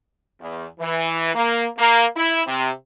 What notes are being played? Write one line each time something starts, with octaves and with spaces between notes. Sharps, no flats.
E2
E3
A#3
A#3
E4
C3